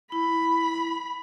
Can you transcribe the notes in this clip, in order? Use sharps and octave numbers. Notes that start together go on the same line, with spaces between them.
E4 B5